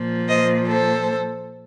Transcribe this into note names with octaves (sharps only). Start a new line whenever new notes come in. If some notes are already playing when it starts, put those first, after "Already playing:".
Already playing: A#2 F3
C5 D#5
A4 C5